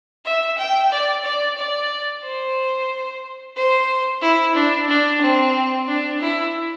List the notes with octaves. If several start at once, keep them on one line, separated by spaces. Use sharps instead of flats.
E5
G5
D5
D5
D5
C5
C5
E4
D4
D4
C4
D4
E4